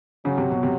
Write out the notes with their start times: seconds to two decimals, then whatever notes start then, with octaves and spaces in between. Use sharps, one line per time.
0.25 C#3 F#3
0.38 C3
0.51 B2
0.63 C3